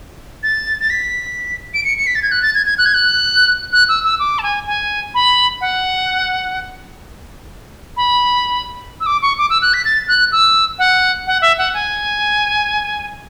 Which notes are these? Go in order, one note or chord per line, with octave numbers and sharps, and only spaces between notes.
A6
A6
B6
D7
C#7
C#7
B6
A6
G#6
F#6
A6
G#6
G#6
F#6
G#6
F#6
F#6
E6
E6
D6
A5
G#5
G#5
B5
F#5
B5
E6
D6
C#6
D6
E6
F#6
B6
A6
F#6
E6
F#5
F#5
E5
F#5
G#5